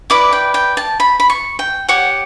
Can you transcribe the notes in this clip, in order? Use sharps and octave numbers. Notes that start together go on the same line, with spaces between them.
E4 B4 D5 D6
G5
G5
A5
B5
B5
C#6
G5
G4 C#5 F#5